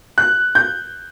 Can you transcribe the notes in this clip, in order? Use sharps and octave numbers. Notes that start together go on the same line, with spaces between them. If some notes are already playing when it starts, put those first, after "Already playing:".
F#6
G6